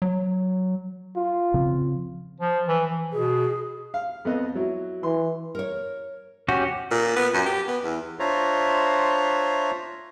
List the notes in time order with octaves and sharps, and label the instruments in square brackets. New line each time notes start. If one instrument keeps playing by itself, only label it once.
[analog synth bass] F#3
[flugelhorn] F4
[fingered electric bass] C#3 F3 C4
[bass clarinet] F3
E3
E3
[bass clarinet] B2 [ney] G#4
[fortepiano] F5
F2 B3 D#5
F#3 E4
[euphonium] E3 [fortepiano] C6
[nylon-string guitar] A#4 C#5
[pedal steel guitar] C#4 F#4 G4 [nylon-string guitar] F#5
[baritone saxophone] A#2
B3
F#2
G4
B3
E2
[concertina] D4 F4 C5 C#5 E5 A#5